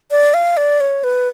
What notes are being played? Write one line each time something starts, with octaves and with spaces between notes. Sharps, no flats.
D5
F5
D5
C#5
B4